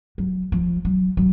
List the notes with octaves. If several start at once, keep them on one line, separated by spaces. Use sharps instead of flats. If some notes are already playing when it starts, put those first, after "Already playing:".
F#3
F3
F#3
F#3